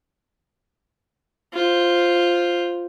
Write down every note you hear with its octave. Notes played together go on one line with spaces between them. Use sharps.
F4 C5